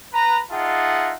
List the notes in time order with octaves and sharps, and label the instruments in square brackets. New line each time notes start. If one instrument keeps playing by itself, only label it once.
[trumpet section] B4 A#5
D#4 F4 G#4 E5 F#5 A5